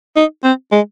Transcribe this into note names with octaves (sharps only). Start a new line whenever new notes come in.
D#4
C4
G#3